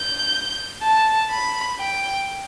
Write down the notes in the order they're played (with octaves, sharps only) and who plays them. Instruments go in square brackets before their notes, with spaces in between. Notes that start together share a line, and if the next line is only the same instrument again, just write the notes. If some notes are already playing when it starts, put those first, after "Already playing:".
Already playing: [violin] G6
A5
B5
G5